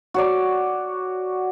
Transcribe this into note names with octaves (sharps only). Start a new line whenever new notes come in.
F#4 C#5 D5